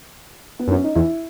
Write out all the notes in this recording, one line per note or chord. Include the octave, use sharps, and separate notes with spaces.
B3
F#2
C#4
D#4
E2 E4